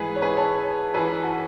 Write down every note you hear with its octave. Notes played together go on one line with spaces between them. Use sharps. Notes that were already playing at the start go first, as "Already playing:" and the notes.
Already playing: G#2 E3 G#4 B4
C#5
G#4 B4
A4 C#5
F#2 E3 G#4 B4
F#4 A4